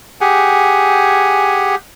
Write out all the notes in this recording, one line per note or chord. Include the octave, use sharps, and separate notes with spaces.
G4 G#4 F#5 G#5